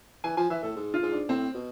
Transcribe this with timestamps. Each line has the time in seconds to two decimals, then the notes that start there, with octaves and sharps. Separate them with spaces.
0.24 E3 G#5
0.37 F3 G#5
0.50 E3 E5
0.63 A2 A4
0.76 G#2
0.94 F4
1.03 G#2
1.12 D4
1.29 A2 C4
1.54 B2